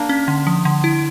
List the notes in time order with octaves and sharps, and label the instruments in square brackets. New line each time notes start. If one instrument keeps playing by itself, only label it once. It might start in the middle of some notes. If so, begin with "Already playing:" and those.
Already playing: [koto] A#3 D4
[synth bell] C#4
D3
F3
D3
E4